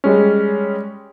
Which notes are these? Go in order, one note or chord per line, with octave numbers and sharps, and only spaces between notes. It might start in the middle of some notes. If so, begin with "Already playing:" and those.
G3 G#3 C#4